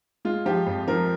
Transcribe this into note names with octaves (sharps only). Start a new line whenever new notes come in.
G#3 F4
F3 G4
F2
F3 A#4